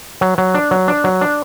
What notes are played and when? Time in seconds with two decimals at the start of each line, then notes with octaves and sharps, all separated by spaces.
0.21 F#3
0.38 F#3
0.54 D4
0.71 F#3
0.88 D4
1.04 F#3
1.21 D4